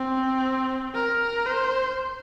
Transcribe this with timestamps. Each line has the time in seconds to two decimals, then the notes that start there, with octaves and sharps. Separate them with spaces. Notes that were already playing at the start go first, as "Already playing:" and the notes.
Already playing: C4
0.94 A#4
1.46 C5